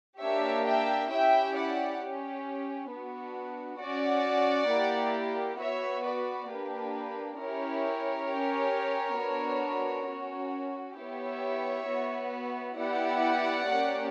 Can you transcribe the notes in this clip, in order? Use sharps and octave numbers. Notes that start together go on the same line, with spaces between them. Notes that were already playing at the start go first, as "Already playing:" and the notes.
A#3 D4 G4 C#5 E5
E5 G5
C#4 E4 G4 E5 G5
D5 F#5
C#4 G4
B3 D4 F#4
C#4 F#4 D5 F#5
A#3 E4 G4
B3 F#4 C#5 E5
B4 D5
A#3 D4 G4 B4
C#4 E4 G4 A#4 C#5
C#4 G4
B3 D4 F#4
C#4 F#4
B3 E4 G4 C#5 E5
B3 F#4
B3 E4 G4 D5 F#5
A#3 C#4 G4